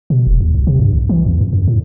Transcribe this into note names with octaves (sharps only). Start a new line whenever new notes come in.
B2
E1
D#2
C2
C3
G2
B1
E3
E2
F2
F#2
A2